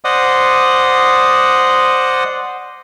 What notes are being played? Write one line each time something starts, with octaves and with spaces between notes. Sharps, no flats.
C5 D5 D#5 F#5 D#6